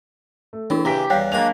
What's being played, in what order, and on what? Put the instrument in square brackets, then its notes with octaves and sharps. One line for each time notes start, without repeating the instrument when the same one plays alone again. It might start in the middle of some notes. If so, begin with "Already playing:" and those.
[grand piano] A3
[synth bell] E3 D4 E4 [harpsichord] C4
[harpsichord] C#3 E3 [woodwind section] G4 [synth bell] A#5 [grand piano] A#6 B6
[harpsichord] E2 G3 [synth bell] C#5 F#6 [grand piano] F5 G5 B6
[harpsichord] F#3 G#3 B5 [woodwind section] A#3 D4 [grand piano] A#5 F7